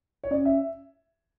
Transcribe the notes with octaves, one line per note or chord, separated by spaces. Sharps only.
C#5
C#4 D5
E5